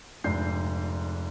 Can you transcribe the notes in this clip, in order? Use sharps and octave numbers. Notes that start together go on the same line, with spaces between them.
F1 G#2 D4 G6 C7